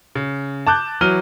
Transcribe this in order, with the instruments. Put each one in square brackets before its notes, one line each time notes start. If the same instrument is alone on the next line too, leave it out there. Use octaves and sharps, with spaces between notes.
[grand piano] C#3
A5 D6 F#6 G6
E3 F#3 F6 D#7 G7